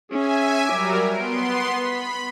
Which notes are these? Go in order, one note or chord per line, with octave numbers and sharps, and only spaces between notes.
C#4 G#4 E5 G#5
F#3 G3 A#4 E5 D6
B3 C6 D7
B5 B6